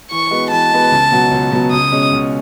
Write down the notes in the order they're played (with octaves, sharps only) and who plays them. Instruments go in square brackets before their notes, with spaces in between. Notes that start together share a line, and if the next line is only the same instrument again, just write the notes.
[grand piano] E3 [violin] C#6
[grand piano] G#3 B3 F#4 B4
[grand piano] E3 [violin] A5
[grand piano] G#3 B3 F#4 B4
C#2
B2 F#3 B3 F#4
C#2
B2 F#3 B3 F#4
[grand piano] C#2 [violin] D#6
[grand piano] B2 G#3 C#4
C#2